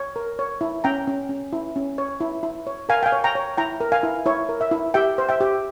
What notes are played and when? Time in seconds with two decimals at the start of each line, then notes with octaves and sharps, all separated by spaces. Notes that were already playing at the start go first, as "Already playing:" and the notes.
Already playing: C#5
0.16 A#4
0.39 C#5
0.61 E4
0.84 C#4 G5 A#5
1.07 C#4
1.29 C#4
1.53 E4
1.76 C#4
1.98 C#5
2.21 E4
2.43 E4
2.67 C#5
2.89 A#4 F5 G#5
3.03 G5
3.06 F5 G#5
3.12 C#5
3.24 G5 A#5
3.35 C#5
3.58 E4 G5 A#5
3.80 A#4
3.92 F5 G#5
4.03 E4
4.26 E4 C#5
4.49 A#4
4.61 E5
4.71 E4
4.94 G4 E5 G5
5.18 C5
5.29 E5 G5
5.41 G4